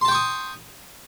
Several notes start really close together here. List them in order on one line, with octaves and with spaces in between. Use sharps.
C6 A5 G5 C#6 D#6